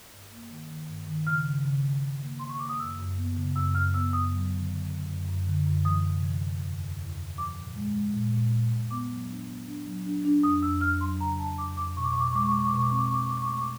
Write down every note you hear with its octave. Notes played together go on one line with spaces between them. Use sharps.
G2
A#3
D#3
D#3
G2
D#3
C#3 F6
C#3
C#3
C#3
C#3
A#3
C#3 C6
C#6
A#3 D6
D#6
F#2 E6
F#2
B3
C#3
F#2 E6
F#2 F6
B3 E6
F#2 D#6
F#3
D3
D3
D3
F#2
F#2
D3
F#2
E3 D#6
C3
E3
E3
E2
E3
E2
E2
F3 D6
A#2
G#3
G#3
A#2
A#2
A#2
A#2
B3 D6
F#3
D4
B3
D4
F#3
D4
D4
F2 D#6
F2 E6
F2 F6
F#3 C6
C#3 A#5
F2 A5
F2 D6
F2 D6
B2 C#6
D6
C#6
B2 D6
C#6
G#3 D6
C#6
B2 D6
C#6
D6
B2 C#6
D6
C4 C#6
D6
C#6
C4 D6
C#6
C4 D6
C#6
D6
A3 C#6
D6